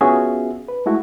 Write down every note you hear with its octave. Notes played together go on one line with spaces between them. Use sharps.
B3 C#4 F4 F#4 G#4 E5
B4
G#3 A3 E4 F#4